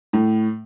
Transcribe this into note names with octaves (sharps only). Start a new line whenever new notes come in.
A2